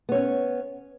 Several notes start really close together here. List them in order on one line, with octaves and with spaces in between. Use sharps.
B3 C#5 C#4